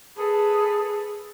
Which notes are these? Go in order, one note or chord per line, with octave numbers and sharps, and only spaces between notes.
G#4 A4 B4